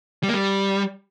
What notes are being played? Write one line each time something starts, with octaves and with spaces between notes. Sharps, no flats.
G3
A#3
G3